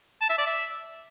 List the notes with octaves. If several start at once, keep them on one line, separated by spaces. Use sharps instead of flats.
A5
E5
D5
E5